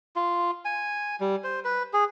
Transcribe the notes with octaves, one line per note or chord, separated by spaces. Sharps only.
F4
G#5
G3
C5
B4
G#4